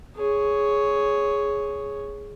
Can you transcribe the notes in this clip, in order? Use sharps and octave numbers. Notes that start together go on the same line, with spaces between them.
G#4 C#5